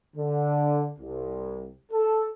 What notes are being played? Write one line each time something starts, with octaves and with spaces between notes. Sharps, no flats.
D3
C2
A4